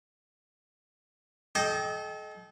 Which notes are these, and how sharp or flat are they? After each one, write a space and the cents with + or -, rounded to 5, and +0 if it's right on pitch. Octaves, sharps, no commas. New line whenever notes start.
A4 -40 D#5 +0 G5 +0